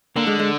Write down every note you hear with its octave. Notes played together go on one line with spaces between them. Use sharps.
D3 A#3
G#3
G#3